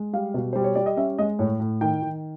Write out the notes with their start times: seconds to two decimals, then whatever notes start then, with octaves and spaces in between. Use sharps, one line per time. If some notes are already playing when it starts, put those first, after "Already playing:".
Already playing: G#3
0.13 G3 F5
0.34 B2
0.53 G3 C5
0.64 C#5
0.75 G3 D5
0.86 D#5
0.97 C#4 E5
1.18 G#3 D#5
1.39 A2 C#5
1.60 A2
1.81 D#3 G5
2.02 D#3